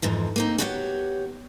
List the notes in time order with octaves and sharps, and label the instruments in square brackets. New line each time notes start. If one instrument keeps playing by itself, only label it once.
[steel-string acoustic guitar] F2 G#2 E3 F3
A#3 C4 D#4
B3 F#4 G4 C#5 E5 F#5